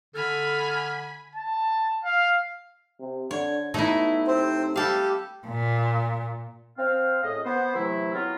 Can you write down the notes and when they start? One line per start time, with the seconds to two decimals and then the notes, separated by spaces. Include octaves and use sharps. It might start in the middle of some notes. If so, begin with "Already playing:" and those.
0.15 D3 A4 G#5 B5 F6
1.36 A5
2.05 F5
3.00 C3
3.31 D3 C#5
3.74 B2 A3 D#4 E4
4.27 C3 C4 C5
4.76 G3 G4 A4 F5
5.47 A#2
6.78 C4 F5
7.23 A2 G#4 D#5
7.45 B3 C5
7.75 C3 E3 F#3 A3 E4
8.14 F#3 B3 C4 E4 F4 A#4